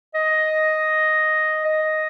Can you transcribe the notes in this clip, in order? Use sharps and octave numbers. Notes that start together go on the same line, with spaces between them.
D#5
D#5